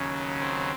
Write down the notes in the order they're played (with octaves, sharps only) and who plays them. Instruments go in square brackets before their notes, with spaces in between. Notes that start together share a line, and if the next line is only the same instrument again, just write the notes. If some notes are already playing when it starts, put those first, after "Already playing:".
Already playing: [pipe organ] D#2 C#3 F#3 C#4
C4